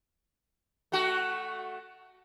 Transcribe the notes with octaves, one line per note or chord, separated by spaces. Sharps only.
A3 F#4